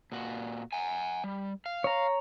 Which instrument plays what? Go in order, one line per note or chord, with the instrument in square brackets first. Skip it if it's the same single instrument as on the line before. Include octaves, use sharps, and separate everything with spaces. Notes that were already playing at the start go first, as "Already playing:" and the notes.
[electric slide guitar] A#2 F#4
F#5 G#5
G3
F5
[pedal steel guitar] C#5 A#5